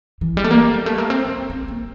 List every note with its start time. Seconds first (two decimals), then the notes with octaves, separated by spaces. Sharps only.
0.21 E3
0.37 G3
0.44 A3
0.51 A#3
0.74 G3
0.86 A3
0.98 A#3
1.10 C4
1.25 C4
1.50 C4
1.68 A#3